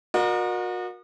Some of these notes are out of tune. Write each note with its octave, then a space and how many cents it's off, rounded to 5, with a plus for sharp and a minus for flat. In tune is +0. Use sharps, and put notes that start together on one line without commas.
F#4 -35 A#4 +20 D#5 -40